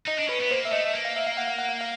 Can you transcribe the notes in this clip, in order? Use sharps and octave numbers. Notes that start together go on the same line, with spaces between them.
D#4 D#5
D4
C#4 B4
B3
A#3 C5
E5
A3 D#5
E5
A#3
F5
E5
F5
F#5
F5
F#5
F5
F5